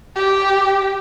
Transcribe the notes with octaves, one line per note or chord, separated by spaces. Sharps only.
G4